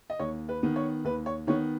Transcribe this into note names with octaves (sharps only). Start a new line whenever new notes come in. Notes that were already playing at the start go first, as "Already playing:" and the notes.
D#5
D#2 C#5
B4
D#3 B3
C#5
D#2 B4
C#5
D#3 B3 C#5